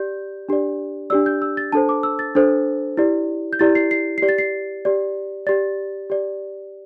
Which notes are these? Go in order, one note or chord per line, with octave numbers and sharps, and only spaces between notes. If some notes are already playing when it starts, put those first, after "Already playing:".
Already playing: G4 D5 G6
D4 G4 D5
D4 G4 D5 E6
G6
E6
A6
D4 A4 C5 A5
D6
E6
A6
D4 A4 C5
E4 G4 D5
G6
E4 G4 D5 A6
C7
C7
G4 D5 C7
A6
C7
G4 D5
G4 D5 A6
G4 D5